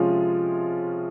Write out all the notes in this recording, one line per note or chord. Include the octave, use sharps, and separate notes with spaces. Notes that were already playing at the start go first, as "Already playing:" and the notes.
Already playing: C3 F3 G#3 C#4 F4